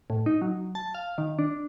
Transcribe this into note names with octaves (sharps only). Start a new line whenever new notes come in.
A2
D#4
F#3
A5
F5
D#3
D4